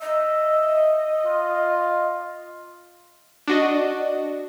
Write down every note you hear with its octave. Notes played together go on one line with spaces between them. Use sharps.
D#5 E5
F4
D4 F#4 D#5